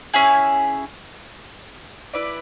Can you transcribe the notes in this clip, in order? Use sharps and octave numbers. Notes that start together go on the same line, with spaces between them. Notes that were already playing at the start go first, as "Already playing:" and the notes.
C#4 E4 G#4
E4 B4 D5